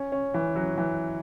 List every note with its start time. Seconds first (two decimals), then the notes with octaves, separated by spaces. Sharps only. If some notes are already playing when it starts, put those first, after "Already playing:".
Already playing: C#4
0.12 C#4
0.34 E3
0.56 F#3
0.78 E3